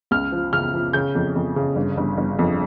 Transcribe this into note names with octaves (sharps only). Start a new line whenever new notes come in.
C#2 F6
F3
C#3 F6
F3
C#3 G6
F2
F2
C#3
G1
G1
G1
F2